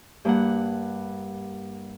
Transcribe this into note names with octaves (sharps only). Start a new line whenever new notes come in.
G2 A#3 F#5